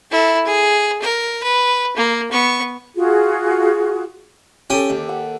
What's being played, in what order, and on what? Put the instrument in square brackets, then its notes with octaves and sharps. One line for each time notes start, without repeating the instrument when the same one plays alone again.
[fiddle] E4 A4
G#4
A#4
B4
A#3
B3 C#6
[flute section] F4 F#4 G#4
[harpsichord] C#4 G5 G#5 [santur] G4 A4
[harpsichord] D#2
[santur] F#5